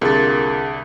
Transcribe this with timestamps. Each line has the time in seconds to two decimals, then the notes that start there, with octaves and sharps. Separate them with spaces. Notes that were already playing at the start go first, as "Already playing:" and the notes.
0.01 C2 A#2 D3 G#4 A6